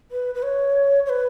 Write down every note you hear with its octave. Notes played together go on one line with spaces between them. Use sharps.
B4
B4
C#5
C#5
B4